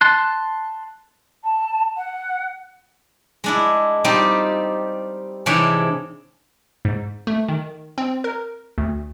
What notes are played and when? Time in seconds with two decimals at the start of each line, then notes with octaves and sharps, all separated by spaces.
0.01 A5 C6 F#6
1.44 A5
1.97 F#5
3.44 G#3 D4 E4
4.04 G3 C4 D#4 F4 G4
5.46 G#2 C3 E3 D4 C#5 G5
6.85 G#2
7.27 A3
7.49 D#3
7.98 C4
8.24 A#4
8.78 D2